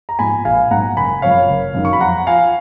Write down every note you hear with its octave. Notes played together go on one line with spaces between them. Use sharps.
A#5
G#2 F3 G#5 B5
A#1 F5 G#5
G#2 F#3 F#5 A#5
F#1 G#5 B5
F#2 C#3 F3 C#5 F5
F#1
F#2 D#3 F#3
C#6
B5
F2 F#5 A#5
F3 F5 G#5